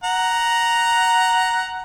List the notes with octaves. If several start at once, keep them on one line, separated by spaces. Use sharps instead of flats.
F#5 A#5